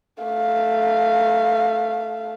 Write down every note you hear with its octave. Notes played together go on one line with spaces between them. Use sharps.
A3 F5